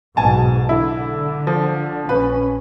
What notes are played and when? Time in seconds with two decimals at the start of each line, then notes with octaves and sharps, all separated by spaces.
0.17 B1 G#2 B2 G#5 A5
0.69 D3 E4
1.47 F3
2.09 A#1 C#4 B4